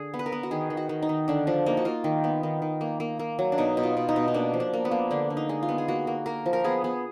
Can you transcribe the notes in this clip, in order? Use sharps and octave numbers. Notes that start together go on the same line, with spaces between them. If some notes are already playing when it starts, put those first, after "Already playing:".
Already playing: D3 G#4
B3
B4
A#4
B3
F#4
D#3 G#4
D#3
F#4
D#3
D#4
D#3
D3 D4
F3 D4
A#3 D#4
F#4
A#3 F4
D#3
B3
D#3
D#3
A#3
A#3
A#3
F#3
D4
B2 D#4
B2
F4
B2
D#4
B2
D#4
A#3 D4
F3
D4
A#3
B3
A#3
D3 D4
D3
D#4
G#3
F4
B3
G#4
A#3 F#4
A#3
A#3 A#4
F3
A#4
B3 G#4
B3 G#4